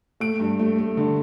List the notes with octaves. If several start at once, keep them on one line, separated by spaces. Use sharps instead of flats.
A3 D7
G2
A3
A3
D3